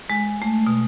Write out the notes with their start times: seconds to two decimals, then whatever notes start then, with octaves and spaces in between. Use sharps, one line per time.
0.10 G#3
0.42 A3
0.66 B2